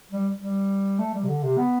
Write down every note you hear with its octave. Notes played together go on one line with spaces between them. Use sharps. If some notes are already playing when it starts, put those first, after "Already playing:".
G3
G3
A3
G3
C3
D3
C3
B3